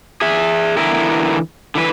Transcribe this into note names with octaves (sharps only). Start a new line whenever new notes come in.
G#4 E5
D3 E3 B3 E4 A#4
D3 E3 B4